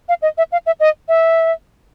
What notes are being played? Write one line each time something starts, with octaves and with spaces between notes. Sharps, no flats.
F5
D#5
E5
F5
E5
D#5
E5